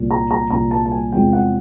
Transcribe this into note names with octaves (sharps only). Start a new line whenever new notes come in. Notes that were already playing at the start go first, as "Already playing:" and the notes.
Already playing: C2 A#2 F3
A#5
A#5
C2 A#2 F3 A#5
A5
A5
G#5
E2 C3 F3 G#3 C4 G5
F#5